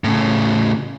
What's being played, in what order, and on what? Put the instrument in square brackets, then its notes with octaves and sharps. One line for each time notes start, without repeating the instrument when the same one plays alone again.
[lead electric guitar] A2 C#3